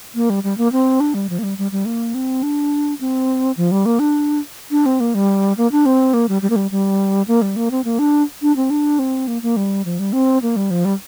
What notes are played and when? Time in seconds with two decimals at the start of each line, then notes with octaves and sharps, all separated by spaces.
0.15 A#3
0.30 G3
0.44 G3
0.58 A#3
0.72 C4
1.00 D4
1.14 G3
1.30 F3
1.39 A#3
1.43 G3
1.58 G3
1.72 G3
1.86 A#3
2.15 C4
2.43 D4
3.01 C4
3.57 F3
3.71 G3
3.86 A#3
3.99 D4
4.71 D4
4.86 C4
5.00 A#3
5.15 G3
5.57 A#3
5.72 D4
5.86 C4
6.14 A#3
6.29 G3
6.42 G3
6.50 A#3
6.56 G3
6.71 G3
7.28 A#3
7.42 G3
7.56 A#3
7.71 C4
7.84 A#3
7.99 D4
8.42 D4
8.56 C4
8.70 D4
8.99 C4
9.28 A#3
9.42 A#3
9.57 G3
9.85 F3
9.99 G3
10.13 C4
10.42 A#3
10.56 G3
10.71 F3
10.85 G3